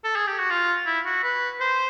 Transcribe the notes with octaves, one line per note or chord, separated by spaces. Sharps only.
A4
G#4
G4
F#4
F4
E4
F#4
B4
C5